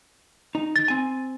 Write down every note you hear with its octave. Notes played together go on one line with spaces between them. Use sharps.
D#4
A6
C4 G#5